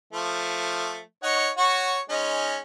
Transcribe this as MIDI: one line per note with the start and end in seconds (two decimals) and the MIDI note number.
0.13 1.01 53
0.13 1.01 57
1.23 1.49 63
1.23 1.49 73
1.23 1.49 78
1.58 1.99 66
1.58 1.99 73
1.58 1.99 85
2.10 2.59 56
2.10 2.59 61
2.10 2.59 63